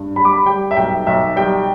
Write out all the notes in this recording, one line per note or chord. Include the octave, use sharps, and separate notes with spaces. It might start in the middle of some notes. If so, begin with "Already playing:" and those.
Already playing: G2
G3 B5
D6
B5
G3 G5
E5
B1 G5
B1 E5
G3 G5